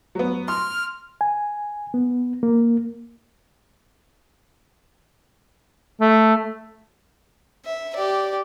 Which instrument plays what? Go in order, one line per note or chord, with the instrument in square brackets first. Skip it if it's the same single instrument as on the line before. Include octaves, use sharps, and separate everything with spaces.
[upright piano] F#3 B3
[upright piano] C6 [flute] F6
[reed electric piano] G#5
B3
A#3
[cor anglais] A3
[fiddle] E5
G4 D5